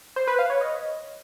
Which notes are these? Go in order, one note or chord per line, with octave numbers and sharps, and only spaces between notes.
C5
B4
F5
C#5
D#5